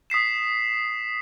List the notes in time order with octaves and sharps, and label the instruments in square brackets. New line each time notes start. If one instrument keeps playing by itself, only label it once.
[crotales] D#6 B6 C7 E7